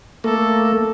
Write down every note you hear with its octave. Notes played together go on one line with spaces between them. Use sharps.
A3 A#3 A4